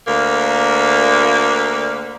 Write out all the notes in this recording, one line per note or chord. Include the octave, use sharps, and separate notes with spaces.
D2 A#3